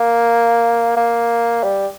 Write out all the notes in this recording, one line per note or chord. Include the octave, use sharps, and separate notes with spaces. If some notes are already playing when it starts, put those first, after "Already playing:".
Already playing: A#3
A#3
G3